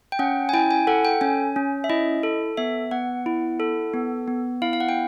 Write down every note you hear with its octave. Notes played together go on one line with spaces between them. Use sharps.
G5
C#4 F#5
G#5
E4 G5
G#5
A4 F#5
G5
C#4 G#5
C#4
E5
E4 D#5
A4
B3 E5
B3 F#5
E4
A4
B3
B3
E4 F5
F5
F#5
G5